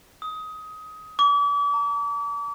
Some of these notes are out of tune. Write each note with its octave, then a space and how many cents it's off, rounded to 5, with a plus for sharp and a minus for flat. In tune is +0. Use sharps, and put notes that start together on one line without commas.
D#6 +20
D6 -40
A#5 -45